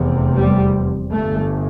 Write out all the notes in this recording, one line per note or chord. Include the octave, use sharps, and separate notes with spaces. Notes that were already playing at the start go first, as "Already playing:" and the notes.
Already playing: F1 E2 C3
G3
G1 G2 A3